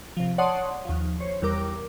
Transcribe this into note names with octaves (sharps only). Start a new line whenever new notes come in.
C3 F3
C#5 D5 F#5 A5 C6 D#6
D#2 F3
C5 C#5
E2 G3 A#4 D6